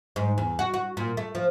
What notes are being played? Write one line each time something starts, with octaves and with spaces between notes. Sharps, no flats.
G#2
E2
F#4
F#4
A#2
A3
F3